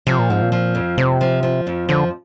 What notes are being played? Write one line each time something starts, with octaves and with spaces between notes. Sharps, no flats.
C3 F3
A#2
G#2 C4
A#2
F3
F2
C3 C4
F3
F3
F2
D3 F3